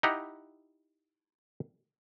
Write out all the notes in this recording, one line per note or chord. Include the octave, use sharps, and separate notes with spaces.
D#4 E4 G4 F#5 A#5